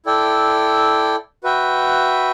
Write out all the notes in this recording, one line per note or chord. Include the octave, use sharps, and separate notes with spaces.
E4 A4 D5 G5
F#4 B4 E5 G5